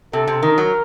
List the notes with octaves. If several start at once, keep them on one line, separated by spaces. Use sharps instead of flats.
C3 A4
C3
D#3 A#4
F#3